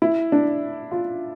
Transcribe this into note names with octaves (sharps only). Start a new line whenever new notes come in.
E4
D4
F4